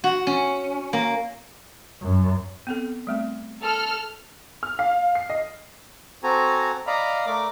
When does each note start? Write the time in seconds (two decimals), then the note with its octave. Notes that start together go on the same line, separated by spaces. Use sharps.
0.04 F#4
0.27 C#4
0.93 A#3
2.01 F#2
2.67 B3 C4 A4
3.07 G3 A3 C4
3.61 A4 F6
4.63 F6
4.79 F5
5.15 C7
5.30 D#5
6.23 C4 F#4 A4 G#5 A#5
6.87 D5 D#5 F5 A#5 B5
7.26 A3 A#4 D5 D6